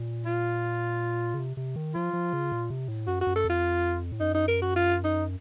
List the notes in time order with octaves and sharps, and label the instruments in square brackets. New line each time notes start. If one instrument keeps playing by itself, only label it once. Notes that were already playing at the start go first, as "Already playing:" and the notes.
Already playing: [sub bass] A#2
[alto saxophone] F4
[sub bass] C#3
C3
C3
D#3
[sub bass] F3 [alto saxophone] F4
[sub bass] F3
C#3
A#2
C3
A2
[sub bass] F#2 [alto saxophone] F#4
[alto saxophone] F#4
[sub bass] F#2
[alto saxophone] A4
[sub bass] F2 [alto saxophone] F4
[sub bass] A2
[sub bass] F#2 [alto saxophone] D#4
[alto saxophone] D#4
A#4
F#4
F4
D#4